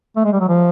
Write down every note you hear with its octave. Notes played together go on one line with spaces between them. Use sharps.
A3
G#3
G3
F#3
F3